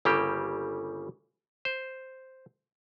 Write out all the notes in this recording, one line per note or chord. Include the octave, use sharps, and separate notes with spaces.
G1 C#3 G3 A#3 G4
C5